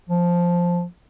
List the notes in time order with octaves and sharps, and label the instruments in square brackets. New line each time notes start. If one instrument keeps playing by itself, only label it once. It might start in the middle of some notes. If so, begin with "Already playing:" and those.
[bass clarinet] F3